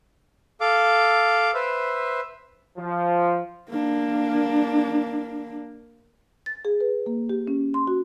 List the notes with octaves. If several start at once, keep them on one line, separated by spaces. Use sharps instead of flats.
A4 F5 D6
B4 C5 E5
F3
A#3 D4
A6
G#4
B4
A#3
G4
C#4
C6
F#4